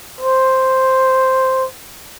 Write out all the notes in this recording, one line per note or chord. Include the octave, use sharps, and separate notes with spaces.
C5